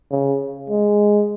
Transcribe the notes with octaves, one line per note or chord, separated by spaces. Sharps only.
C#3
G#3